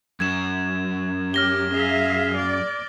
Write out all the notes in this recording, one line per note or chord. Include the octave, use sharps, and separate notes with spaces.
F#2 G#6 E7
C#4 G4 F6 A#6 G7
G#4 E5 F5
D5